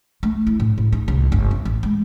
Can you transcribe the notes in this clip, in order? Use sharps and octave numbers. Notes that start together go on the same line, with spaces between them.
A3
E4
A2
A2
D#4
C2
G1
C4
A1
G#3